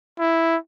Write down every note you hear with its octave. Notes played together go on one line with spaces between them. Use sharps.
E4